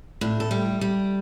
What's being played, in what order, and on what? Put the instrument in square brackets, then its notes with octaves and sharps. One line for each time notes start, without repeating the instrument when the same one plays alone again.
[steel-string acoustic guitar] A2 D4
A4
G3 G4
G3